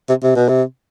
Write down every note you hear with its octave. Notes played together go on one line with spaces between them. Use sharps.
C3
C3
B2
C3